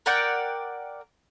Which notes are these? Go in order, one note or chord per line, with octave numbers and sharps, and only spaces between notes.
A#4 D5 F#5 G5